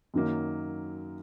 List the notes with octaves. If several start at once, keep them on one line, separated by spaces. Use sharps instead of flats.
F#2 D#3 F#3 A#3